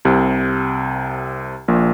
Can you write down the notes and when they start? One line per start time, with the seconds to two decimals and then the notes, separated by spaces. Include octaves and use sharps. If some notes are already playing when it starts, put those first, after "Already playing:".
0.05 C2 C3
1.68 A#1 A#2